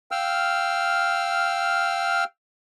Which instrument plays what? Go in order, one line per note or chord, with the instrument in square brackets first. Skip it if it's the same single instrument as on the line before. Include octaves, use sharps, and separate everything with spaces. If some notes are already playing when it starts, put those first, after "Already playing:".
[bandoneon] F5 G5 E6 F6